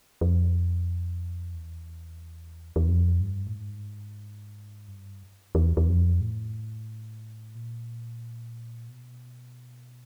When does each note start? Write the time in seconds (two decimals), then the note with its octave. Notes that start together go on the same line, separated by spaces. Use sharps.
0.21 F2
1.54 E2
2.76 E2
2.88 F2
3.21 G2
3.47 A2
3.54 G#2
4.88 G2
5.55 E2
5.77 E2
5.88 F2
6.21 A2
7.55 A#2
8.88 B2